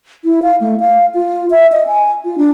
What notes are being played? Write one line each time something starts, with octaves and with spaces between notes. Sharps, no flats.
E4
F5
A3
F5
F4
E5
D#5
G#5
F4
D4